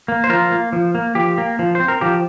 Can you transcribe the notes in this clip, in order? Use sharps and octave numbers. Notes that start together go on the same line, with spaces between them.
A#3
C5
F3 F4 A#4
A#3
F3
A#3
F3 G4
A#3
F3
C4 C5
A#4
F3 G4